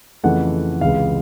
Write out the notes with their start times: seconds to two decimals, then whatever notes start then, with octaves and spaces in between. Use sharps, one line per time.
0.23 F2 C#3 E3 A3 F#5
0.81 C#2 C3 E3 G#3 F5